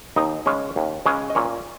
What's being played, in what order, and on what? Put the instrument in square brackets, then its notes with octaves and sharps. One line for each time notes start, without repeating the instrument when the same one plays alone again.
[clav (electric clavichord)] D#2 D#4 D#5
C#3 G#3 C#4
D#2
C#3 G#3 C#4
D#5
A#2 C#4 C#5